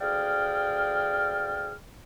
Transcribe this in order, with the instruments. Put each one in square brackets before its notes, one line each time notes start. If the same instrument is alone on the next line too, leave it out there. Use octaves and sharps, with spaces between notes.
[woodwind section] D2 G#4 D5 F5 G5 F6